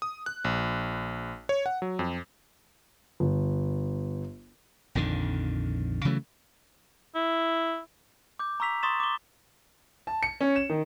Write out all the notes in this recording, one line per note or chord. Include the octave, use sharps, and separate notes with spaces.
D#6
F#6
A#1
C#5
F#5
F#3
F2
G1
A#1 F2 D3 D#3
C#3 E3 F#3 A3
E4
D6 G6
A#5 C#6 E6 B6 F7
C6 C#6 D#6 A6 B6 E7
D6 G7
A5
C#7
C#4
E7
D#3